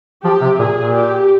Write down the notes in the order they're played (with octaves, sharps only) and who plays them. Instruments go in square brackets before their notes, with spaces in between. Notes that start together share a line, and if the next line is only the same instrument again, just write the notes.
[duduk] F3 [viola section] G4
[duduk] C3
[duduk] A#2 [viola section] G#4
[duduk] A#2
[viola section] G4